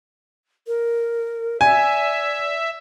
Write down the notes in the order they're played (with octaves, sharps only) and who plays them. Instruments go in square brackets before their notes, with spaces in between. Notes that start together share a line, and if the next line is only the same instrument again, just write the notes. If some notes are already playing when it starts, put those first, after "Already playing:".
[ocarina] A#4
[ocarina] D5 [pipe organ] E5 [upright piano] G#5